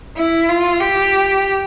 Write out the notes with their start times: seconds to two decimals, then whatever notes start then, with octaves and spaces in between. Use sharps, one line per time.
0.17 E4
0.49 F4
0.80 G4